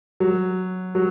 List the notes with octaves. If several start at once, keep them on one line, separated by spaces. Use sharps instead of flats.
F#3
F#3